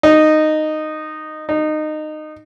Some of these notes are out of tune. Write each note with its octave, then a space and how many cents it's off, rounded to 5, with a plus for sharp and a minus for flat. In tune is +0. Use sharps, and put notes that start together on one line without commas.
D#4 -10
D#4 -20